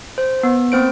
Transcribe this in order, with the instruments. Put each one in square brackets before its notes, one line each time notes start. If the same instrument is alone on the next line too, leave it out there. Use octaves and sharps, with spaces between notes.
[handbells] C5
B3
A#3 C4 C5 D7